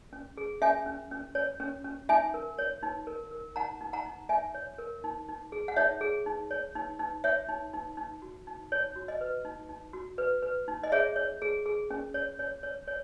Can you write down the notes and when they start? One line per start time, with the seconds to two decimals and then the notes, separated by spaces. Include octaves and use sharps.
0.13 C#4
0.37 G#4
0.61 C#4 E5 G#5
0.86 C#4
1.11 C#4
1.35 C#5
1.60 C#4
1.84 C#4
2.09 D#4 E5 G#5
2.34 A#4
2.58 C#5
2.83 D#4
3.07 A#4
3.31 A#4
3.56 D#4 F#5 A#5
3.81 D#4
3.93 F#5 A#5
4.06 D#4
4.29 D#4 E5 G#5
4.54 C#5
4.78 A#4
5.04 D#4
5.28 D#4
5.52 G#4
5.68 F#5
5.76 D#4 C#5 E5
6.01 G#4
6.26 D#4
6.51 C#5
6.75 D#4
6.99 D#4
7.24 C#5 E5
7.49 D#4
7.73 D#4
7.97 D#4
8.22 F#4
8.47 D#4
8.72 D#4 C#5
8.96 F#4
9.08 D#5
9.21 B4
9.45 D#4
9.69 D#4
9.93 F#4
10.18 B4
10.42 B4
10.68 D#4
10.83 D#5
10.92 G#4 C#5 E5
11.16 C#5
11.42 G#4
11.66 G#4
11.90 C#4
12.14 C#5
12.39 C#5
12.63 C#5
12.88 C#5